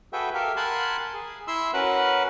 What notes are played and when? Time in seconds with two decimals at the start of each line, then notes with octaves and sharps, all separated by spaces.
0.13 F#4 G#4 A4 B4 E5 G5
0.34 G4 A4 A#4 E5 F5
0.56 A#4 F#5 G#5 A5 B5 C6
1.14 G#4
1.48 E4 E5 C6 E6
1.74 C#4 F#4 A#4 B4 F#5